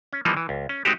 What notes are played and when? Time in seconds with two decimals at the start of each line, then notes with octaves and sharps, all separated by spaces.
0.13 C#4
0.25 E3 F3 G3 A#3 D#4
0.37 E3
0.49 C#2
0.69 C#4
0.85 G#3 C4 D#4 F#4 G4